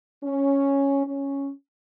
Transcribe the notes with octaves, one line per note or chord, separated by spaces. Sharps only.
C#4
C#4